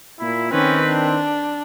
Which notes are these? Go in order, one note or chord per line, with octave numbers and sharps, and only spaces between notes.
A#2 E4
D#3 C4 C#4 B4
D4